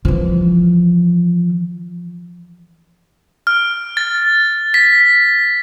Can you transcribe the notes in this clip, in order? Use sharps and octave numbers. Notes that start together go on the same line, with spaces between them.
E3 F3
F6
A6
B6